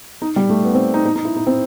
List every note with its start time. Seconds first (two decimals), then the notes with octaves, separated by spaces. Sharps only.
0.22 D#4
0.36 G3
0.49 A3
0.63 B3
0.74 C4
0.94 D#4
1.05 D#4
1.16 D#4
1.25 E4
1.36 D#4
1.47 C4